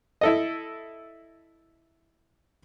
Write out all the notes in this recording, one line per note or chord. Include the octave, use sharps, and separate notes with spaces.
E4 A4 D#5